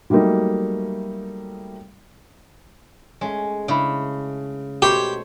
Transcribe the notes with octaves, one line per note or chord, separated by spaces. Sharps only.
F#3 G3 A3 A#3 D#4
G#3 A3 C#4
C#3 D4 E4
B2 A3 G4 C5 C#5